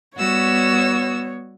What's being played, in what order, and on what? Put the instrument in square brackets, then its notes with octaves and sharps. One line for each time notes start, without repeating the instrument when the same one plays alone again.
[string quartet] G3 F#4 E6 [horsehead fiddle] B3 C#5